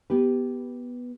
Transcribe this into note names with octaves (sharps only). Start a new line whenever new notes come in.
B3 G4 B4